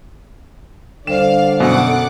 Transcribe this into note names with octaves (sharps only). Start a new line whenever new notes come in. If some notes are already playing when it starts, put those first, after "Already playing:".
D3 G3 C5 D5 F5 E7
F#2 B2 F#5 D6